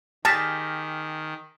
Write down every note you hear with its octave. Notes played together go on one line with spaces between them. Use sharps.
D#3 G4 G#4 A5 F6 A#6 B6